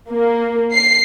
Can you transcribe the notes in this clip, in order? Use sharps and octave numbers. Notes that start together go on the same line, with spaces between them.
A#3
C7